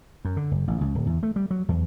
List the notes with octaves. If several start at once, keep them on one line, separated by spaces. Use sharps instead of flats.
F#2
D3
F#1
A1
C#2
D1
E2
A3
G3
F#3
E2